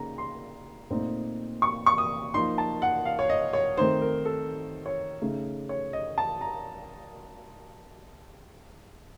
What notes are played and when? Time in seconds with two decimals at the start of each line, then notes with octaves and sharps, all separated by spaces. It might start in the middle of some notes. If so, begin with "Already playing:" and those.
Already playing: C#3 A#3 D#4 A#5
0.18 C6
0.90 A#2 A3 C4 D#4
1.62 C#6
1.86 C#6
1.98 D#6
2.34 F3 A#3 D#4 C6
2.58 A5
2.82 F#5
3.05 F5
3.19 C#5
3.29 D#5
3.53 C#5
3.77 D#3 A3 C4 D#4 C5
4.01 A#4
4.25 A4
4.86 C#5
5.21 C#3 A3 D#4
5.69 C#5
5.93 D#5
6.18 A5
6.41 A#5